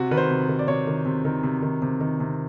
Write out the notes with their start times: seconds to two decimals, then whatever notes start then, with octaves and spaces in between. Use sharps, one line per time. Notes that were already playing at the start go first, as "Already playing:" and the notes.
Already playing: C3 F#4
0.11 D#3 B4
0.17 C5
0.30 C3
0.49 D#3
0.59 D5
0.67 C3 C#5
0.87 D#3
1.05 C3
1.25 D#3
1.43 C3
1.62 D#3
1.82 C3
2.00 D#3
2.20 C3